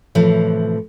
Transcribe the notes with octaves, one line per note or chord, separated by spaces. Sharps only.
A2 C3 E3 F3